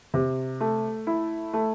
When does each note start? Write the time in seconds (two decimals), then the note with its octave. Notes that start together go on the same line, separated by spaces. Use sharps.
0.14 C3
0.61 A3
1.07 E4
1.53 A3